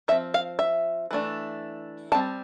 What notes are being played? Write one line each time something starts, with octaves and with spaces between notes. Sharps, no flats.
F3 C4 E5
F5
E5
E3 A3 D4
G3 C4 A5